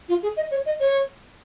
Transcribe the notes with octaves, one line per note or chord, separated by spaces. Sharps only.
F4
G#4
D#5
C#5
D#5
C#5